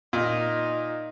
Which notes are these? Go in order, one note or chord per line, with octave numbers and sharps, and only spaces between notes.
A#2 D#4